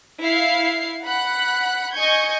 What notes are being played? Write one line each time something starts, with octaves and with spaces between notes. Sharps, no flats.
E4 F5 C7
F#5 B5 F#6
D#5 G#5 C#6 G6 G#6